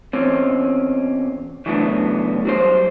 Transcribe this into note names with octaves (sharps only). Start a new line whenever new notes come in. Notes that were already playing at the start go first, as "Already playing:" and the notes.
E2 C4 C#4
C#3 E3 F#3 A3 B3 D4
F#3 G3 C5